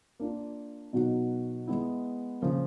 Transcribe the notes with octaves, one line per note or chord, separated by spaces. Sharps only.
A#3 D4 F4
B2 F#3 B3 D#4 F#4
G#3 B3 E4
C#3 F3 A#3